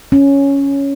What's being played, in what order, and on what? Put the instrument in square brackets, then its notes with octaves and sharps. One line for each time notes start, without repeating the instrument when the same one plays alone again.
[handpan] C#4